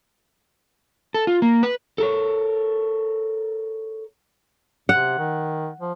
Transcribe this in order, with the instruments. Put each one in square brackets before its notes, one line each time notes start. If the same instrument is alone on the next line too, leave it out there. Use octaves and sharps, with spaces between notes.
[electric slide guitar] A4
F4
A#3
B4
[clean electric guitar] A4 A#4 C#5
[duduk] C3 [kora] F#5
[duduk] D#3
F3